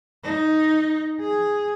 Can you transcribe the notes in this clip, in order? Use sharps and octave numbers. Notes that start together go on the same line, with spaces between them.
D#4
G#4